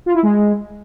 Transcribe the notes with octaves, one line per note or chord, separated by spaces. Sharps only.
F4
E4
G#3